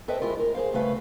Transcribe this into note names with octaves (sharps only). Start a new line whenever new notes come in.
A4 B4 C5 D#5 E5 G5
G#3 A#3 E4 F4 G4 A#4
A#4
G#4 C5 F5
D2 G2 C#3 A3 B4 F5